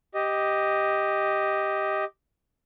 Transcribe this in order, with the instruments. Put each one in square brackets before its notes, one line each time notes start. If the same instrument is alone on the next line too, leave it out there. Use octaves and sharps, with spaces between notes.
[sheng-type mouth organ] G4 D#5